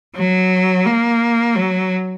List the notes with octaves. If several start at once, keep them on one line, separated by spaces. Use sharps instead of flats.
F#3
A#3
F#3